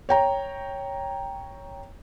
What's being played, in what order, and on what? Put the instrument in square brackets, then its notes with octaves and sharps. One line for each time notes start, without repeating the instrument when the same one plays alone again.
[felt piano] C#5 G5 A#5